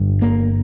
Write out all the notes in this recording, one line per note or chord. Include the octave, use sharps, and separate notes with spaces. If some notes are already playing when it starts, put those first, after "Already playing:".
Already playing: G1 G2
A#3